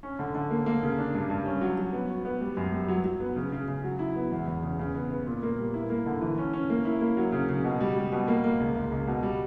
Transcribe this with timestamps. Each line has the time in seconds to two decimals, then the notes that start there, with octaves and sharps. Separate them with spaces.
0.03 C#4
0.19 D3
0.35 D3
0.51 A#3
0.66 A#3
0.83 C#3
0.98 D4
1.14 G2
1.30 G2
1.46 C#4
1.61 F#3
1.78 F#3
1.93 B3
2.10 F#4
2.25 B3
2.41 G3
2.57 F#2
2.73 G3
2.88 F#3
3.04 F#3
3.20 B3
3.36 C#3
3.52 C#3
3.68 C#3
3.84 F#3
3.99 E4
4.16 B3
4.32 E2
4.48 E2
4.63 C#3
4.79 C#3
4.95 B3
5.10 B3
5.27 A#2
5.43 A#3
5.58 G3
5.74 E4
5.90 A#3
6.06 D3
6.21 E3
6.38 C#4
6.53 C#4
6.70 A#3
6.85 E4
7.01 A#3
7.17 F#3
7.32 C#3
7.49 C#3
7.64 B2
7.81 G3
7.96 G3
8.12 B2
8.28 A#3
8.44 A#3
8.60 C#2
8.76 C#2
8.91 C#2
9.07 B2
9.23 G3